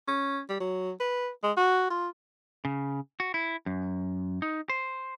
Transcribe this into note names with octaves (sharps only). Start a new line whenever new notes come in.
C#4
G3
F#3
B4
G#3
F#4
F4
C#3
F#4
E4
F#2
D#4
C5